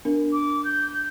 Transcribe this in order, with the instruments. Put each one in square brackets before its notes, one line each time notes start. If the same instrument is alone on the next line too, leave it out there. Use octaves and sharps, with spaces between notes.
[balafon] B3 D4 A#4
[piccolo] D6
G6